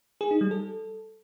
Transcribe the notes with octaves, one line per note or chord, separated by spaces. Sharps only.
G#4
D#4
G3
A4